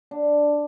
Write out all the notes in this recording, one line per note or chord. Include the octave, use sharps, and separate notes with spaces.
D4